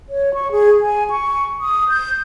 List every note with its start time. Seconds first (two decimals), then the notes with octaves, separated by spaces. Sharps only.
0.10 C#5
0.34 C#6
0.51 G#4
0.81 G#5
1.10 C#6
1.61 D#6
1.89 G6